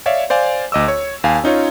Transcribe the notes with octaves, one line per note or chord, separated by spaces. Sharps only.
C#5 D5 E5 F5
C5 D5 F5 G#5
D2 D#5 D6 E6
C#5
D#2 F5 G#5
C#4 D#4 F4 C#5